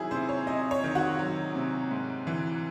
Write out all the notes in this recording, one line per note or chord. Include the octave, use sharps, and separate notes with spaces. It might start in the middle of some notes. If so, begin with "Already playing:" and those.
Already playing: C3 D#3 F#3 E4 G#4
C3 C5
C#5
C3 D#5
C#5
D#3
F#4
F#3
C3
G#2
E3